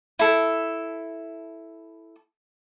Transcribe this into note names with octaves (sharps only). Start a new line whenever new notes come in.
E4 A4